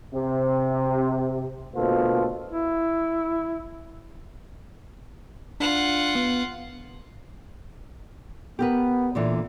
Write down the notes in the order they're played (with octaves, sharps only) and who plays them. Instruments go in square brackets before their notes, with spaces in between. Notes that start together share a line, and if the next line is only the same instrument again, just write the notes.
[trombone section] C3
D2 B2 A#3 F4 A4 C5
[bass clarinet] E4
[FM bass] D4 [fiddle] F4 F#5
[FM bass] B3
[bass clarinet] B3 [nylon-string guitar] G4 A#4 B4
[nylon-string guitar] A#2 D3 E3